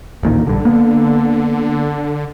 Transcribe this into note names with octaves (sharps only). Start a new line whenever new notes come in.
A1 D2 A#2 D#3
A#1 G2 D3
A#3 B3